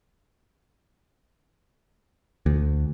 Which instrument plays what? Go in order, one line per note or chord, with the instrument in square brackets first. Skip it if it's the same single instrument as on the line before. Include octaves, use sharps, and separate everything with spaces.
[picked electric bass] D2